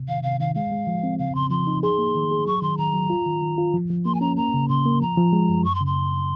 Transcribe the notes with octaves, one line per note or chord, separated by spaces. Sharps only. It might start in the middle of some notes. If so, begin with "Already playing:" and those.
Already playing: C3
D#3 F5
C3 F5
D#3 F5
G#3 F5
G#3
F3
C4
C#3 F5
C#3 C6
F3 C6
D#4
G#4 C6
A#3
D#3
G#4
F#3 C#6
D#3 C6
D#3 A#5
F#3
F4
D#3
D#3
F4
F3
F3
A#3 C6
G#5
C#4 A#5
A#3 A#5
C#3
C#3 C6
A#3
F3 A#5
F3
G#3
F#2
F#2 C#6
C6
C#3
C6
F#2